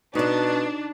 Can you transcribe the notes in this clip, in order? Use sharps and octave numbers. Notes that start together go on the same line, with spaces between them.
B2 D4 D#4 D5